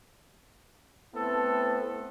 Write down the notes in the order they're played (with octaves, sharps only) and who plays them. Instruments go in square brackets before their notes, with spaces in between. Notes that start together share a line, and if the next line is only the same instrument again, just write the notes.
[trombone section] A3 B3 C4 E4 A4